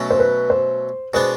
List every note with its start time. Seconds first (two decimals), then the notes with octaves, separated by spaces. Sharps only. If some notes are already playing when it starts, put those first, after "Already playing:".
Already playing: B2 F#3 A3 C#4
0.10 C5
0.19 B4
0.50 C5
1.14 B2 G#3 B3 D4 C5